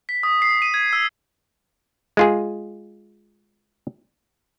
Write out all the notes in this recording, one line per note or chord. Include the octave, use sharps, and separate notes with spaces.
B6
D#6
C7
D#7
G#6
E6
G#3 F4 G#4